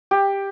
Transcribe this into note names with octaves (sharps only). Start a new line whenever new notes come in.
G4